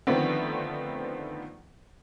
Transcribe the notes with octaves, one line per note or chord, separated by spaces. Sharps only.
D3 D#3 F3 A3 B3 C4